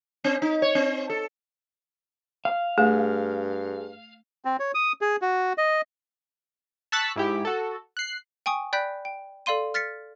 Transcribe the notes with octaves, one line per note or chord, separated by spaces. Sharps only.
C4
D#4
C#5
C4
A4
F5
G2 A3 G#4
C4
C#5
D#6
G#4
F#4
D#5
A5 C#6 E6 F#6 A6 B6
G#2 E4 G4
F#4 A4
F#6 C7
G5 G#5 C#6 D#6
D5 G5 B5 F#6 G6 B6
G5
A4 D5 F5 C6 D#7
F6 A6 B6 C#7